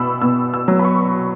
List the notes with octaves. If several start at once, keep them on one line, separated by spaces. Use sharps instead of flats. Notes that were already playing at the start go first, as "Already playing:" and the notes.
Already playing: B2 B5 E6
B2 E6
E6
F#3
B5
C#6